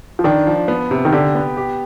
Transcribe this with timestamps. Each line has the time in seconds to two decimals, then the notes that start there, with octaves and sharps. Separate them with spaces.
0.19 F3
0.24 D#3 D4
0.47 F3
0.68 B3
0.91 C3
1.05 D#3
1.13 D3 G4
1.35 B3
1.57 G4